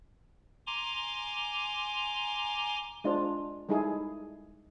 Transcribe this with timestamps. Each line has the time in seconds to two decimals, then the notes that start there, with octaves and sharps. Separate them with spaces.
0.67 G#5 A#5 C6 D6
3.04 G#3 D4 F4 C5
3.69 G3 G#3 D#4 E4 G#4 A4